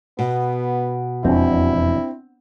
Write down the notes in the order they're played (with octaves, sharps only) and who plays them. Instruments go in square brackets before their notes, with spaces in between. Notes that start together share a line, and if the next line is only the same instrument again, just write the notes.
[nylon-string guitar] B2 [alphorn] B3
[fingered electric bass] E1 F2 [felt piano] C4 D4 [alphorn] E4